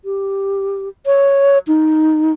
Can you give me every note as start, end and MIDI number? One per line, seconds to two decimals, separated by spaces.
0.05 0.89 67
1.06 1.58 73
1.68 2.33 63